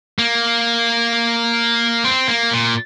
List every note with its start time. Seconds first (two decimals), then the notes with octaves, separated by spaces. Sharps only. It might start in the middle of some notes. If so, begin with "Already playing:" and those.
0.19 A#3
2.05 C4
2.28 A#3
2.51 A#2